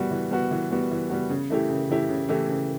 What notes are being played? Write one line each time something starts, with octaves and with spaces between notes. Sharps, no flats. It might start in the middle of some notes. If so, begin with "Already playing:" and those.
Already playing: E3 G3 B3 F#4
E3
G3 B3 F#4
E3
G3 B3 F#4
E3
G3 B3 F#4
C#3
E3 A3 E4 G4
C#3
E3 A3 E4 G4
C#3
E3 A3 E4 G4
C#3